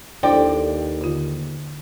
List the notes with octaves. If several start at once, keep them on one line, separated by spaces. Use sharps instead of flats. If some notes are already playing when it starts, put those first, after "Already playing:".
D#2 D4 E4 A4 C5 D5 D#5 G5
D3 F4